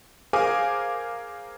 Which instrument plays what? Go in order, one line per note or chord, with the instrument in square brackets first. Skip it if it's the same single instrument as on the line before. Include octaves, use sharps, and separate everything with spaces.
[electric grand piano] G#4 A#4 C5 F5 G#5 D6